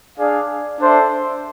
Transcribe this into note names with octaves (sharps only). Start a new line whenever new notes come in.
D4 G#4 D5 F5
D4 A4 C5 E5